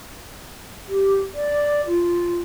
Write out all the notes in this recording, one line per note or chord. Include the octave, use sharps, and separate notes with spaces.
G4
D5
F4